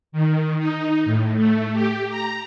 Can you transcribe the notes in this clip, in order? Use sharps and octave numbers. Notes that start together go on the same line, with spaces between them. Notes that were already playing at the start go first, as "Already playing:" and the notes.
D#3
D#4
A2
A3
G4
A#5